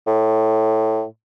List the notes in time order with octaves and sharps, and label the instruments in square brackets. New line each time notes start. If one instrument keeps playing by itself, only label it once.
[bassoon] A2